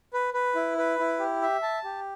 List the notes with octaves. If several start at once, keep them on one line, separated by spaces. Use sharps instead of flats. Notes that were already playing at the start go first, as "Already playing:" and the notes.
B4
B4
E4
B4
E4
G4
E5
A5
G4